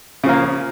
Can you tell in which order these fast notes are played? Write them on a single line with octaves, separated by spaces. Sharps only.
C#3 F3 A#3